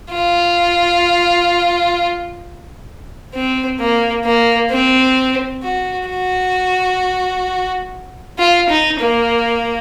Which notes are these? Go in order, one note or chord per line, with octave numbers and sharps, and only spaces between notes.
F4
C4
A#3
A#3
C4
F#4
F#4
F4
D#4
A#3